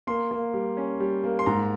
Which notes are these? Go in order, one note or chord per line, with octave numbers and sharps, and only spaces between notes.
A#3 C6
A#3
G3
C#4
G3
A#3
C6
G#2 A#5